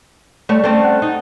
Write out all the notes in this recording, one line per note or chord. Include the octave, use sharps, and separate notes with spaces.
G3 A3 C#5
A3 C4 C#4 D5 A5
F#5
D#4